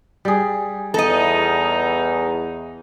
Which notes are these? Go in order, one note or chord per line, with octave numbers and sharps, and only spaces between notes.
G3 G#4
E2 D#4 A4 D#5